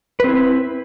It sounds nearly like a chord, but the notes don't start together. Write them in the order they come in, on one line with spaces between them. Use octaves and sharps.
B4 C4 E4